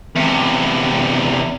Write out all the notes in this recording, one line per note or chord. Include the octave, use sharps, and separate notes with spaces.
E2 C3